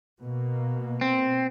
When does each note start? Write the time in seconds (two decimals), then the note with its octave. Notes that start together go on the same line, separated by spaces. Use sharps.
0.21 B2 A#3
1.01 C4